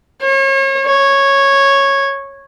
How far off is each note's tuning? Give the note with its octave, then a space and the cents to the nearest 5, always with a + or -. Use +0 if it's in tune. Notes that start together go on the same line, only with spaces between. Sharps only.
C#5 -35
C#5 -10